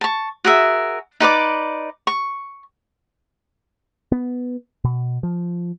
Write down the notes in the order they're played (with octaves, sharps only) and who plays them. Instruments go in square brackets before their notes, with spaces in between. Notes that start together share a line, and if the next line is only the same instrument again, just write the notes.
[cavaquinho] A5 C#6
F#4 G#4 A#4 E5
D#4 B4 D5 D6
C#6
[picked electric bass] B3
B2
F3